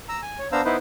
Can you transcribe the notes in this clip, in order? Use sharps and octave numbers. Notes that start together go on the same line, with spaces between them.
A#5 E6
G#5
C#5
B3 D4 C5 F5 A#5 E6
B3 D#4 E4 B4 C5